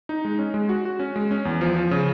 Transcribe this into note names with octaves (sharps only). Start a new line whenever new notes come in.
D#4
G#3
C#4
G#3
F#4
F#4
C#4
G#3
C#4
E2
F3
F3
C#3